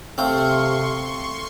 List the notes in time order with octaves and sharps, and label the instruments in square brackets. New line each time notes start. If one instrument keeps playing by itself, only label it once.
[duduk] C3 [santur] A3 F5 E6 [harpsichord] C4 C5 [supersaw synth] C6 C#6